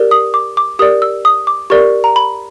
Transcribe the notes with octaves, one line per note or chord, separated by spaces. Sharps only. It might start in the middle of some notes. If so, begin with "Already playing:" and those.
Already playing: G4 A#4 D5
D#6
D6
D6
G4 A#4 D5 D#6
E6
D#6
D6
G4 A#4 D5 C#6
A#5
B5